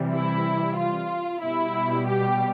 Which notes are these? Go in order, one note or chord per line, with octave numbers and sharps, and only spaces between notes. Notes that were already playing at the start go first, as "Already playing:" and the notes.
Already playing: C3 E3 G3
E4
F4
B2 G3 E4
G4